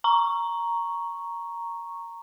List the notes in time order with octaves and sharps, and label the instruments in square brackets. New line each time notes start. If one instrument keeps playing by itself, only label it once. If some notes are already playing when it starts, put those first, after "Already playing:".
[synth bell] A#5 C#6